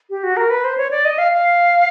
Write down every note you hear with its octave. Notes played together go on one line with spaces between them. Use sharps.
G4
F#4
A#4
B4
C5
C#5
D5
D#5
F5
F5